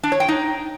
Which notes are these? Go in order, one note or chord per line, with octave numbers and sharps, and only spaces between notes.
D4
C#5
G5
D#4